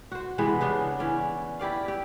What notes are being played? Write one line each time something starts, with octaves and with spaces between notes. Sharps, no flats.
F#4 C5
C3 E3 G#3 B3
C#3 B3 D4
E3 C#4 D5
E4 G4 D5 F5
G4